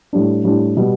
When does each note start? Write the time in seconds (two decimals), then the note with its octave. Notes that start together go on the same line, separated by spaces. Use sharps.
0.13 A2 G3 D4
0.44 A2 G3 D4
0.77 B2 G3 B3